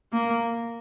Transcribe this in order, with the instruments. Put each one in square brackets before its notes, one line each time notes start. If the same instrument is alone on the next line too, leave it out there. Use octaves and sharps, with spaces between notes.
[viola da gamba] A#3